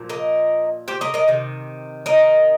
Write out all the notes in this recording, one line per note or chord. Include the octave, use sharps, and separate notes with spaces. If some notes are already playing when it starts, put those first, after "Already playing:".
Already playing: A#2 F3
A#4 D#5
G4 C5
A#4 D#5
A#4 D#5
C3 D#3
A#4 D#5